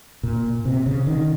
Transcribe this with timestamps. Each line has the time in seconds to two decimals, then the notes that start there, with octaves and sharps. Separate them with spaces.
0.23 A#2
0.65 C3
0.86 C#3
1.07 D#3